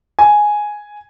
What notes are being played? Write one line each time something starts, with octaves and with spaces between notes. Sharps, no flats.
G#5